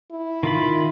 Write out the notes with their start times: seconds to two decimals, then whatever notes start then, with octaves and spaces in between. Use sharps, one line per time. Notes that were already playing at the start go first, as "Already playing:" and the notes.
0.11 E4
0.43 D#3 F4 B5